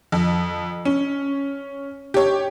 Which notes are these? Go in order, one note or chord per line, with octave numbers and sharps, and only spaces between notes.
F2
C#4
G4 C#5